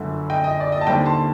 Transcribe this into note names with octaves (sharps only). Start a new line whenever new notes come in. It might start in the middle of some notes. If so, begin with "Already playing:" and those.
Already playing: G1 F#2 D3
D#5 G5
D#5
D5
D#5
A5
D#2 D3 G3 C4 D#5 G5
A5 C6